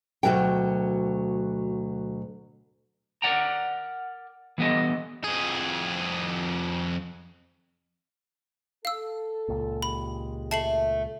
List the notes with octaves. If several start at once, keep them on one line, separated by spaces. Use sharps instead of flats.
D2 G2 B2 F#3 A#4 G5
A#4 B4 D5 F#5 G5 A#5
E3 G3 B3 A4 D#5
F2 G#4
A4 F5 E6
C#2 A#2
G#3 G4 B5
A3 A5 C7 F#7